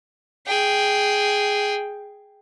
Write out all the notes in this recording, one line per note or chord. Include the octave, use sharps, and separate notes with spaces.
G#4 G5